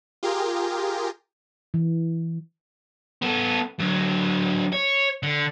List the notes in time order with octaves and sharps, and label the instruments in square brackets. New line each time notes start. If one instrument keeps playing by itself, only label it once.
[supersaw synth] F4 G4 G#4 A#4
[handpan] E3
[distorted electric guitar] B3 A4
D3 F#3
C#5
D3